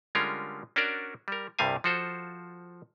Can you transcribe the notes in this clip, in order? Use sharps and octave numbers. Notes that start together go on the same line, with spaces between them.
D3 G3 G#3 C#4 F4 A#4
C#4 D4 F#4 A#4 D5
G3 A#4
C2 G2 C3 G3 F5 G#5
F3 F4 F#4 A4 C5